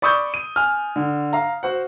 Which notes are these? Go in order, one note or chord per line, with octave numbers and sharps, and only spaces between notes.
D5 B5 C#6 D#6 E6 G6
D#7
G#5 F6
D3
F5 A#5
F#4 C5 F#5